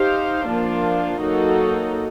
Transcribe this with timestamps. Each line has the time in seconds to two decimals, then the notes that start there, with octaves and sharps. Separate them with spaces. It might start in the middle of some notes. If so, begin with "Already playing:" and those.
Already playing: D#4 G4 C5 F5
0.47 F3 A#3 D4 F4
1.21 F#3 A#3 D#4 F#4 A4